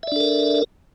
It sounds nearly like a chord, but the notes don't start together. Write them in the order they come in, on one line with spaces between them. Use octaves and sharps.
E5 D5 D4 A4 A#4